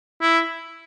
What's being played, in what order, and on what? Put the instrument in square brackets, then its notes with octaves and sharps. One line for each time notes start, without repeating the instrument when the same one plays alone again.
[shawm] E4